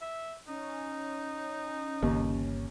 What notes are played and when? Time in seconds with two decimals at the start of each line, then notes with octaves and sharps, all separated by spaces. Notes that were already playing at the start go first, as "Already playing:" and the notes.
0.01 E5
0.48 C#4 D#4
2.02 G1 D#2 C#3